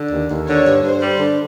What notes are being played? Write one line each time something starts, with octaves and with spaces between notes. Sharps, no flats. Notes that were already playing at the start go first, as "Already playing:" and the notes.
Already playing: D3
D#2
D#2
D3 C#5
G2
G2 C5
G3
D3